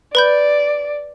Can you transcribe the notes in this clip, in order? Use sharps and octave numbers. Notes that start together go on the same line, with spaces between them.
B4 D5 B5 G6